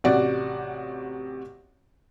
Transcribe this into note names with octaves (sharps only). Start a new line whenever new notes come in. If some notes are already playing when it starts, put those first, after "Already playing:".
A1 C3 F#4 D5 F#5